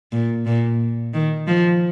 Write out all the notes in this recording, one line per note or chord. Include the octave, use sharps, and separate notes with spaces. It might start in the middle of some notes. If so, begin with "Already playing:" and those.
A#2
A#2
D#3
F3